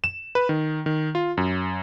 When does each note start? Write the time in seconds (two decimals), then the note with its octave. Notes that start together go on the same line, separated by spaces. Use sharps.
0.04 E7
0.35 B4
0.49 D#3
0.86 D#3
1.15 F4
1.37 F#2